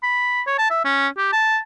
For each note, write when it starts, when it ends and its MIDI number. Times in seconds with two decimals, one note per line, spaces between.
0.03 0.42 83
0.47 0.56 73
0.59 0.70 81
0.71 0.84 76
0.85 1.08 61
1.18 1.31 67
1.33 1.59 81